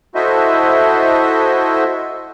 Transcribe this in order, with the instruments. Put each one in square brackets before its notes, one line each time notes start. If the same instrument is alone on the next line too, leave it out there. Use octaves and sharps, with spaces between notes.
[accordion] E4 F#4 A4 C5 D#5 E5